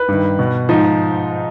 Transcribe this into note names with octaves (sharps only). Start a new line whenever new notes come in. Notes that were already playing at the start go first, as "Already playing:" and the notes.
Already playing: B4
G2 D#3
B2
G#2 F3 D#4